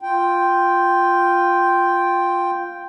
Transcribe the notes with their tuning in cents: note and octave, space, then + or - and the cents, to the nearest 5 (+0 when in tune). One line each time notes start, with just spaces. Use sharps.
F4 +0 G5 +0